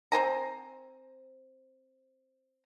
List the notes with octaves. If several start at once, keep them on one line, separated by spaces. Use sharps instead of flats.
C4 C5 G#5 A#5